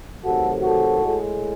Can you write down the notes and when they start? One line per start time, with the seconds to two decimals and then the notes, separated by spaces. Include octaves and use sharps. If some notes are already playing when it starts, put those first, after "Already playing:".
0.25 C3 D#3 F#3 A3 F#4 A4
0.63 F#4 A4
1.01 A2 G#3